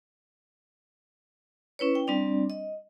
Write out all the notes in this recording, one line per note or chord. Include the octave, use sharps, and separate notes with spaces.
C#4 E4 B4 C#5
G5
G3 C4 D4 D5
D#5